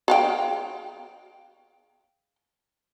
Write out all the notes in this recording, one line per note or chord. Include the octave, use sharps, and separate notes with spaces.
G#4 F5 G5